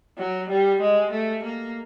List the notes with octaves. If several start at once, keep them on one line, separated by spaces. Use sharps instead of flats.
F#3
G3
G#3
A3
A#3